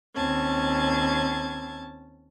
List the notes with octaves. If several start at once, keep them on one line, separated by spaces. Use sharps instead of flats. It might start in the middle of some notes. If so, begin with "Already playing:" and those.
D#2 C4 C#4 A5 G#6